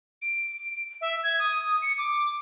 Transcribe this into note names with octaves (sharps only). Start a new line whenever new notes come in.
D7
E5
G#6
D#6
C#7
D6